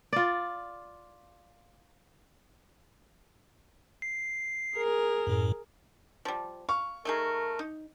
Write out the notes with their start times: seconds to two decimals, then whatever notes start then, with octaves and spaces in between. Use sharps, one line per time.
0.13 F4 D5
4.02 C7
4.77 G#4 A#4
5.27 F#2 A2
6.25 F3 G3
6.69 F5 C#6
7.05 A3 D#4 G#4 A#4
7.59 D#4